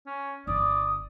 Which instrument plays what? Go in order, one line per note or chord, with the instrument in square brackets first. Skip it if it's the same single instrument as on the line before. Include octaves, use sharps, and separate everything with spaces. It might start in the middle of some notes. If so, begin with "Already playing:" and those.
[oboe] C#4
[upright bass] G1 F4 [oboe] D5 [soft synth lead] D#6